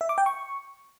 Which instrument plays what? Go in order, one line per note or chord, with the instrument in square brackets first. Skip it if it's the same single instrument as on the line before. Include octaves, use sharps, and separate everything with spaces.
[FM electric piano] E5
D6
G5
C#6